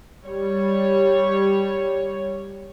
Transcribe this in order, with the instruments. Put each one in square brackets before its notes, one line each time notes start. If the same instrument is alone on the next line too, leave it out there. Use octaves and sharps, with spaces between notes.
[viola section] G3 C#5